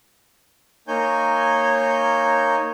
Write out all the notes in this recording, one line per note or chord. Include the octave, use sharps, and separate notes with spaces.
A#3 D#4 C#5 G#5 G6